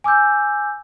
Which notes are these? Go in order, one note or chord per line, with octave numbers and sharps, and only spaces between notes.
G#5 D6 E6 G6